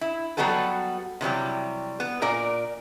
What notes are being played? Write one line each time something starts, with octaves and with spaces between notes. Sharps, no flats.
E4
F#3 G3 B3 F#4 A4 B4
C3 E3 F#3 G3
B3
A#2 A#4 D5